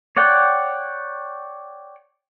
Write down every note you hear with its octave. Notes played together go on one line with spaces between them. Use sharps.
C#5 D5 F#5 G5